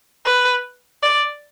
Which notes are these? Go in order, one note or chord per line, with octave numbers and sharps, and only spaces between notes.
B4
D5